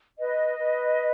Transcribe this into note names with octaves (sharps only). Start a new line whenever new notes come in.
B4 D#5
B4